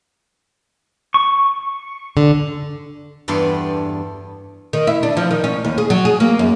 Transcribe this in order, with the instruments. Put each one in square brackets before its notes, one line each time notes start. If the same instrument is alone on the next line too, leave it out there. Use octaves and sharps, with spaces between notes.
[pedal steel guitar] C#6
[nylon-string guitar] D3
[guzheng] E2 G2 B3 A4 D5 C6
[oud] D#3
E4
D4
F3
D#3
C#4
D#2
G#4
F#3
G#4
A#3
F#2